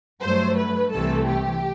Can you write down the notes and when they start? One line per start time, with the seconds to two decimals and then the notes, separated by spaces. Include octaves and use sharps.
0.21 G2 F#3 A3 C5
0.57 B4
0.92 C2 C3 E3 A3 A4
1.28 G4